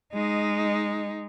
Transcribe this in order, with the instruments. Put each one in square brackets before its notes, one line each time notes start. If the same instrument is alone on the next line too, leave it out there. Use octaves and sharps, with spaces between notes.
[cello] G#3 D#4